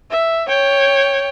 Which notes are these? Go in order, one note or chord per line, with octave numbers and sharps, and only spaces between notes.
E5
C#5 G5